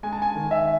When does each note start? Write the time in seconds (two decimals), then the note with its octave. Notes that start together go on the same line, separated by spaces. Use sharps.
0.03 G#3 G#5
0.12 A5
0.22 G#5
0.35 D#3
0.51 E5